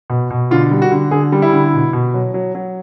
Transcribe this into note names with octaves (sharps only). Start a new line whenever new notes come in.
B2
B2
D3 F4
G3
F#4
D3
D3 G#4
G3
E4
D3
B2
B2
F#3
F#3
F#3